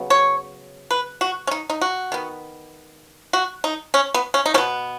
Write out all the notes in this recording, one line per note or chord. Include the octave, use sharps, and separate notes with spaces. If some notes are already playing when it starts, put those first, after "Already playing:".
Already playing: C#3 F#3 B3
C#5
B4
F#4
C#4
D#4
D#4
F#4
D#3 B3
F#4
D#4
C#4
B3
C#4
D#4
B2 B3 C#4